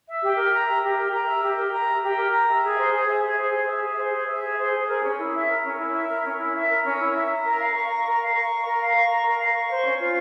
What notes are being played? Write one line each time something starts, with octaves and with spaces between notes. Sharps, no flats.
E5
G4
A#4
A#5
E5
G4
A#4
A#5
E5
G4
A#4
A#5
E5
G4
A#4
A#5
E5
G#4
C5
G#4
E5
G#4
C5
G#4
E5
G#4
C5
G#4
E5
G#4
C5
G#4
A#4
C#4
E4
E5
A#4
C#4
E4
E5
A#4
C#4
E4
E5
A#4
C#4
E4
E5
A#5
A#4
F5
C#6
A#5
A#4
F5
C#6
A#5
A#4
F5
C#6
A#5
A#4
F5
C#6
C5
C#4
F4